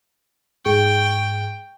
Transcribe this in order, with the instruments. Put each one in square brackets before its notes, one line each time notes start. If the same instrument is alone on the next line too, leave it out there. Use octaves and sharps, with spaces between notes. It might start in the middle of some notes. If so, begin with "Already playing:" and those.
[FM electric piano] G#2 G#4 C#6 [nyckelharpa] G5